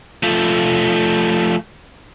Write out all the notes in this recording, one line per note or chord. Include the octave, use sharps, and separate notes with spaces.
F3 A3